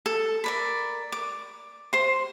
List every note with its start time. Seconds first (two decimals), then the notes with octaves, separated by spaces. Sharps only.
0.06 A4
0.44 A#4 D5 B5
1.12 D6
1.93 C5 C6